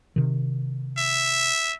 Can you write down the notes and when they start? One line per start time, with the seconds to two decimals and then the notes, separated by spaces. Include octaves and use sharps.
0.16 C3 D#3
0.98 E5